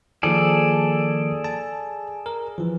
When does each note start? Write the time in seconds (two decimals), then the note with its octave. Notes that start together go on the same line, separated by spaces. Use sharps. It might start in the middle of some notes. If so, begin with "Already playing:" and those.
0.23 D#3 F3 A#3 G#4 A4 D5
1.44 A5
2.26 A#4
2.58 E3 F3